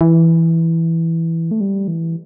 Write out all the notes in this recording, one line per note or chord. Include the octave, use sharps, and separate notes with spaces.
E3
A3
G3
E3